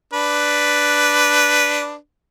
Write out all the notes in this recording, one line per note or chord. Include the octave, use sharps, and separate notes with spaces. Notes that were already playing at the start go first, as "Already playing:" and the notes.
D4 B4